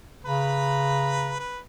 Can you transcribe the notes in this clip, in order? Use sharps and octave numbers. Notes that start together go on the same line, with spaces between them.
C#3 B4 A#5 B5
B4